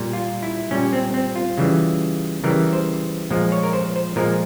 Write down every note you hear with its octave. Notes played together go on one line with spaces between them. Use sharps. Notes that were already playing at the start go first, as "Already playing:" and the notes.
Already playing: A#2 G3
F4
E4
A#2 G3 C#4
C4
C4
F4
C#3 E3 G3
C#3 E3 G3 A#4
C5
A#2 F3 G#3
C#5
A#4
C5
C5
A#2 F3 G#3 A#4